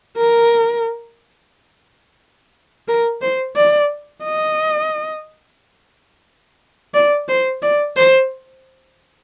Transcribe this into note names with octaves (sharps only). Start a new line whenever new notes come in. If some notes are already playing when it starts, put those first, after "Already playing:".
A#4
A#4
C5
D5
D#5
D5
C5
D5
C5